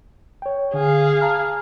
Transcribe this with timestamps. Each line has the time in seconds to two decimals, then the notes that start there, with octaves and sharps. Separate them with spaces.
0.42 C#5 G5
0.74 D3 G#4 F5
1.21 A5 A#5 F6